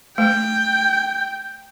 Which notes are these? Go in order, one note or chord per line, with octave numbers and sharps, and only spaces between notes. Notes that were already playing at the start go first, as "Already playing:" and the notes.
A3 G5